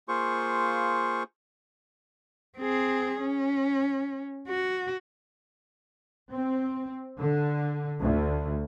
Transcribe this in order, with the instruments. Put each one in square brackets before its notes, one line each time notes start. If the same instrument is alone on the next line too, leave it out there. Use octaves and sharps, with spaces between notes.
[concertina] A#3 F4 G#4 C5 C#6
[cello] C4 G#4
C#4
F#4
[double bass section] C4
D3
D2